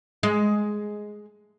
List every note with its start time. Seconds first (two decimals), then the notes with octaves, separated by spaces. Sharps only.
0.23 G#3